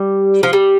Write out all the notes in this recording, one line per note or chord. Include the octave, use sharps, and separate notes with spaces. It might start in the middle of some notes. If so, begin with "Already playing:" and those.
Already playing: G3
F3
G3